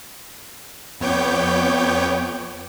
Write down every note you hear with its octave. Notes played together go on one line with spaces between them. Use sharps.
F2 B3 C#5 G5 D6 G6